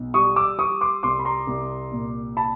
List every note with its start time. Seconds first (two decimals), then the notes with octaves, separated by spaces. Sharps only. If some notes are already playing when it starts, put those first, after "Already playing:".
Already playing: B1
0.14 G3 C#6 D#6
0.36 D6 E6
0.58 G3 C#6 D#6
0.81 C6 D6
1.03 C2 C6 D6
1.19 B5
1.25 A#5 C6
1.47 C2
1.91 A#2
2.37 A5 B5